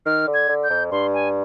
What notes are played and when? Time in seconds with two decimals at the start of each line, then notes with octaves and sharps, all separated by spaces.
0.06 D#3 F6
0.27 D3
0.34 G#6
0.49 D3
0.64 G6
0.70 F2
0.91 G2 C6
1.14 G#5